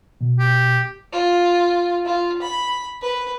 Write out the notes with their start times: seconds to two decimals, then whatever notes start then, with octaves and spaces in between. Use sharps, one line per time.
0.21 B2
0.39 G4
1.13 F4
2.05 F4
2.42 B5
3.02 B4